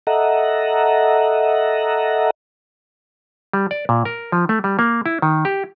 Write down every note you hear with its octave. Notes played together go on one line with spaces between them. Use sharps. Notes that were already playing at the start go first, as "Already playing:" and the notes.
A4 D#5 E5 F#5 A#5
G3
D5
A#2
A#4
F3
A3
G3
A#3
E4
D#3
G4